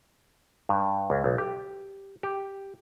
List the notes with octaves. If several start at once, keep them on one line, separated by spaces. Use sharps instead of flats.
G2
C#2
B1
G4
G4